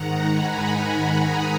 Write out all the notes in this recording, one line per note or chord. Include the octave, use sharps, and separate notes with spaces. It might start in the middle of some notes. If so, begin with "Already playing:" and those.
Already playing: G#2 D#3 F#5 A#5
G#5 B5
G#5 B5
B5 D#6